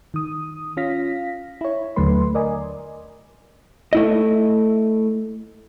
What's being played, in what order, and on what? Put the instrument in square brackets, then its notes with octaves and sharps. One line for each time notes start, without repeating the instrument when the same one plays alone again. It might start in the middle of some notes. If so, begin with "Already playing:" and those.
[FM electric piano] D#3 D#6
C#4 F4 F5 A#6 B6
E4 C#5
D#2 D3 F#3 A3 B4 C6
A#4 D5 D#5 G#5
[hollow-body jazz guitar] A3 E4 D#5